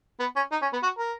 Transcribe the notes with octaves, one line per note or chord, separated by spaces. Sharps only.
B3
C#4
D#4
C#4
B3
F#4
A#4